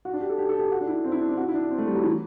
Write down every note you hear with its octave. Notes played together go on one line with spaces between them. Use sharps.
F#4
D4
G4
A4
G4
A4
G4
F#4
D4
E4
C4
E4
D4
C4
F#4
E4
D4
C4
A3
G3
F#3
E3